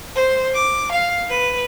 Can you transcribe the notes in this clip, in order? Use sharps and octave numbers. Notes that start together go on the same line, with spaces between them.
C5
D6
F5
B4